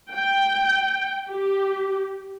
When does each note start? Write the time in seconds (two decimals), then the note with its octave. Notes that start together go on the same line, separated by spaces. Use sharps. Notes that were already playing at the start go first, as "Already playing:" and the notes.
0.13 G5
1.30 G4